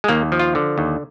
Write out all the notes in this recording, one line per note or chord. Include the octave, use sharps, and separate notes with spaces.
G#3
D#2 A#3
F3
F4
D3
D#2